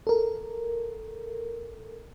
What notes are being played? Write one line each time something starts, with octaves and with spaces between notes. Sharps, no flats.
A4 A#4